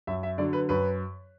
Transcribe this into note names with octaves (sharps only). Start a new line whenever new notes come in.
F#2 E5
E5
D3 F#3 D5
B4
F#2 B4